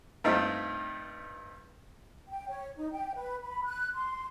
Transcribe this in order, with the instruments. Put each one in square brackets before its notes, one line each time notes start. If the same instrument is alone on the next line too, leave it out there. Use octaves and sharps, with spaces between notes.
[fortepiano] G2 A3 C4 D#4 F4
[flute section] G5
C#5
D#4
G5
B4
B5
F#6
C6